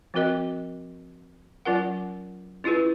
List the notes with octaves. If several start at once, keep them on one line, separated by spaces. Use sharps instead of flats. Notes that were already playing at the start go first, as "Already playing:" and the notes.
F3 C4 F#4 A#4 D#5
F#3 C#4 F4 A#4 F#5
C#4 E4 F4 G#4 B4